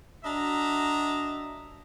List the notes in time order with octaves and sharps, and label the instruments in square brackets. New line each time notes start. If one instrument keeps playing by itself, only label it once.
[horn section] D4 F#4 D#5 E5 A#5